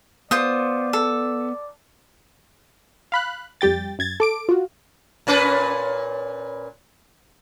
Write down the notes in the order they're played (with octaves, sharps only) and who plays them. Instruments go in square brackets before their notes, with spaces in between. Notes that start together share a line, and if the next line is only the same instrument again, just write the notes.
[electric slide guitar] B3 [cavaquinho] F4 C5 D#6 [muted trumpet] D5
[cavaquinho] A4
[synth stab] F5 B5 F#6
F2 G3 G4 G5 A6
F#2 G#6 A6
A4 D6 D7
F4 F#4
[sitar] A#2 C#4 B4